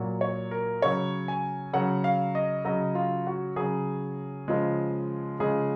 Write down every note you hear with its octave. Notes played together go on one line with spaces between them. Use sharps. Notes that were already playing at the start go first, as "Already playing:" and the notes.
Already playing: A#2 F#3
C#5
A#4
C#3 F#3 C#5
G#5
C#3 F#3 F#5
F5
D#5
C#3 F#3 D#5
F4
F#4
C#3 F#3 G#4
C#3 F3 G#3
C#3 F3 G#3 G#4